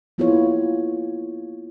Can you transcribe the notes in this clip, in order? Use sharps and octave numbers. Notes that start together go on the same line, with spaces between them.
A#3 B3 E4 F4 G#4 C#5